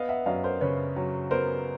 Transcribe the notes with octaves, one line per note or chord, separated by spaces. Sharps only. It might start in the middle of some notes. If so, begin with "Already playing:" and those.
Already playing: B3 D#5 F5
E5 F#5
F#2 D#5 F5
A#4 C5
C#3 B4 C#5
F#3
B3 A#4 C5